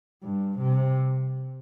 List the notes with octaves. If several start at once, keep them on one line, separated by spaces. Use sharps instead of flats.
G2
C3